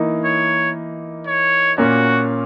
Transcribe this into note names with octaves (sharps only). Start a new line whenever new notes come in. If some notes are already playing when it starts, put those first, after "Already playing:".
Already playing: E3 A#3 D#4
C#5
C#5
A#2 A#3 C#4 F#4